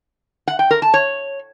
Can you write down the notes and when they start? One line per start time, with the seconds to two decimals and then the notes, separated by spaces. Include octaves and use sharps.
0.48 F#5
0.59 G5
0.71 A#4
0.82 A5
0.94 C#5